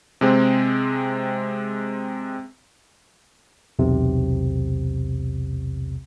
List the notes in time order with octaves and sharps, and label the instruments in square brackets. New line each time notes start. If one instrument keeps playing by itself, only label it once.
[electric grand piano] C3 G#3 C4
[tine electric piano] B1 E2 C3